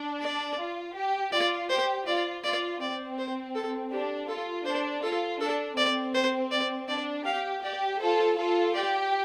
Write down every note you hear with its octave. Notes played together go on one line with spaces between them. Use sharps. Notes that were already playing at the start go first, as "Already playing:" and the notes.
Already playing: D4
D5
F4
G4
F4 D5
G4 C5
F4 D5
F4 D5
C4 D5
C5
A4
D4 G4
F4 A4
D4 C5
F4 A4
D4 A4
C4 D5
C5
D5
D4 D5
G4 F5
G4 D5
F4 A4 C5
F4 A4
G4 D5